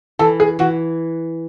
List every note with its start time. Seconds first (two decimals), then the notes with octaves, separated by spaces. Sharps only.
0.19 E3 A4
0.40 G#4
0.59 E3 F#4